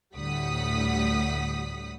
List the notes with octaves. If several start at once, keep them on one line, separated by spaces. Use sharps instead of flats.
D2 A2 G3 F#5 D#6 B6